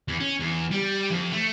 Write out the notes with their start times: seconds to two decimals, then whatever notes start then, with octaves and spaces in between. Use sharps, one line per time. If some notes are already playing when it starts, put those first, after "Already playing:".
0.08 E2
0.20 C#4
0.40 E2
0.71 G3
1.11 F2
1.32 A3